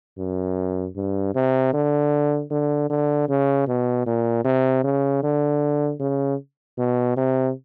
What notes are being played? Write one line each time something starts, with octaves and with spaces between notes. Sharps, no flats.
F#2
G2
C3
D3
D3
D3
C#3
B2
A#2
C3
C#3
D3
C#3
B2
C3